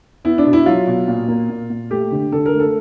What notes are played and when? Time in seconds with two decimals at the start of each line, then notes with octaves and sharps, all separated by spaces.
0.25 B3 E4
0.38 D4
0.46 B2
0.53 E4
0.66 F#3 F4
0.87 B2
1.08 A#2
1.28 A#3
1.50 A#2
1.70 A#2
1.90 A3 G4
2.12 D3
2.32 D3 A4
2.46 A#4
2.52 A3
2.60 A4